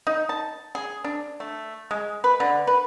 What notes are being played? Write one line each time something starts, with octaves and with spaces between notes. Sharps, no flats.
D#4
A5
G#4
D4
A3
G#3
B4
D3
B4